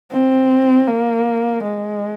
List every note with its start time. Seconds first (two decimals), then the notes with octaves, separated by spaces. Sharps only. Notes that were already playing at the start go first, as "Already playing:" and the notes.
0.12 C4
0.88 A#3
1.63 G#3